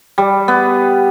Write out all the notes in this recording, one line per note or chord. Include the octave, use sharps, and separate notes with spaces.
G3
B3